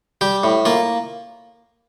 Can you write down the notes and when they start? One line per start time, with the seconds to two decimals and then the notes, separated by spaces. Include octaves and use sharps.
0.21 G3 G4
0.44 A2
0.65 A#3 F4